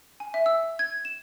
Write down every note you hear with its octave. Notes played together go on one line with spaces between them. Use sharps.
G#5
E5
E6
G#6
E7